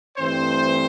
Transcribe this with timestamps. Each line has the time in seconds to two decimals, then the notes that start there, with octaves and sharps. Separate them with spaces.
0.17 G2 E3 A3 C4 C5